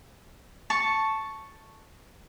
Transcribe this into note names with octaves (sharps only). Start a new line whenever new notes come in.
A5 C#6